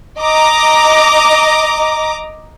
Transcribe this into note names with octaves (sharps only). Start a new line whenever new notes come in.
D#5 A#5 D6